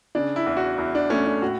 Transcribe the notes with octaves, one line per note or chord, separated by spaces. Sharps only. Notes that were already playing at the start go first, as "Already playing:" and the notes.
C#3 D4
E4
E2
F#4
E2 E4
D4
A3 C#4
D4
A2 F#4